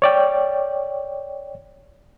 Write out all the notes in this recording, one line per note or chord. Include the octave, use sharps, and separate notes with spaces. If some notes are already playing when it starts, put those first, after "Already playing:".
C#5 D5 G5